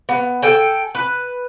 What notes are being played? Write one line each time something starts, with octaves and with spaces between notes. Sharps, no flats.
B3
A4 G5 G#5
B4